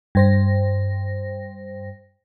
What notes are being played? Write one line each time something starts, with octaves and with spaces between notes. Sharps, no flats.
G2 C5 A#6